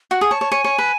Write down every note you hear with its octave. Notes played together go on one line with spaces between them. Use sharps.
F#4 F#5
G#4
C#5 A5
C#5
C#5 G#5
C#5
B4